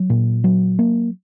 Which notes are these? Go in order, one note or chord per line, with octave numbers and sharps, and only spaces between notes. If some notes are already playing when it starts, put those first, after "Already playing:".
Already playing: F#3
A#2
F#3
A#3